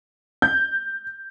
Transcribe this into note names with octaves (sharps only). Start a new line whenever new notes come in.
G6